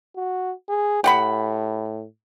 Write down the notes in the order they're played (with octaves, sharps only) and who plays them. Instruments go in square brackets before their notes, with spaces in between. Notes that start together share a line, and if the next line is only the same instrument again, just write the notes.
[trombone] F#4
G#4
[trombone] A2 [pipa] G4 F#5 B5